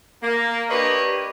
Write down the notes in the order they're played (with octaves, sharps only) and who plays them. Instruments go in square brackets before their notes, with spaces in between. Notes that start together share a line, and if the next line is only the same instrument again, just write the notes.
[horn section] A#3
A#3 D4 G4 B4 C#5 D#5